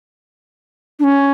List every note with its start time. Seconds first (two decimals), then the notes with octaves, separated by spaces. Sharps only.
0.99 D4
1.04 C#4